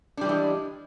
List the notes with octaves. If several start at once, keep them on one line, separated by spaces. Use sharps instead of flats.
E3 G3 G#3 D4